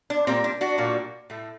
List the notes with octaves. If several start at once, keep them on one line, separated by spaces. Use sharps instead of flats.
D4
A#2 G3 A#3 C4
D4
D4 F#4
A#2 G3 A#3
A2 A3